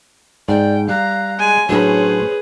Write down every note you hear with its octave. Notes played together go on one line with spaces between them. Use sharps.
G#2 D5 G5
G3 F5 A#5 F#6
G#3 G#5
A2 F#3 C#4 D4 G#4 B4 C5